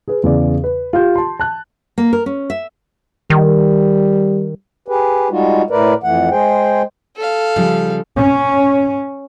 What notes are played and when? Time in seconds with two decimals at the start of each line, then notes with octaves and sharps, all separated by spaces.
0.08 G#4 B4
0.23 E2 C#3 D5
0.64 B4
0.93 F4 G4 G6
1.16 A5 C6
1.40 A5 F#6
1.98 A#3
2.13 A#4
2.26 C#4
2.50 E5
3.30 D#3 G3
4.88 G4 G#4 B4
5.30 G3 G#3 D#4 F4 F#4
5.70 A2 A3 A#4 B4 D5
6.04 F2 E3 A3 F#5
6.31 G#3 G#4 C5 G5
7.17 A4 F5
7.56 C#3 F3 G3
8.18 C#4